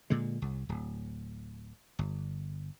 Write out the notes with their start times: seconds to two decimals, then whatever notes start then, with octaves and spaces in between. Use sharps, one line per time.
0.10 A#2 D3 G#3
0.42 C2
0.69 D1
1.99 G1